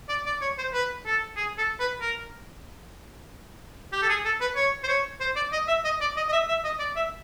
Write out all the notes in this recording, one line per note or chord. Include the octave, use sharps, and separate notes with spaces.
D5
D5
C#5
C5
B4
A4
G#4
A4
B4
A#4
G4
A4
G#4
A4
B4
C#5
C5
C#5
C5
D5
D#5
E5
D#5
D5
D#5
D#5
E5
E5
D#5
D5
E5